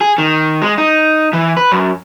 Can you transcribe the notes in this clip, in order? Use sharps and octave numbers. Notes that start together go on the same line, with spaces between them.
G#4
D#3
G#3
D#4
E3
B4
F#2